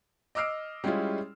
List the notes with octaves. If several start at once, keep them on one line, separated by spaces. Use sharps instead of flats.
D#5 D6 E6 F6 C7 D7
G3 G#3 C#4 E4 F4 G#4